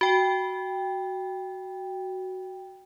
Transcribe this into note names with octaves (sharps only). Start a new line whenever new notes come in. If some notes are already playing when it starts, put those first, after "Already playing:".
F#4 G5